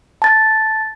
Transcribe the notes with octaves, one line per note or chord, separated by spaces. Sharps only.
A5 A6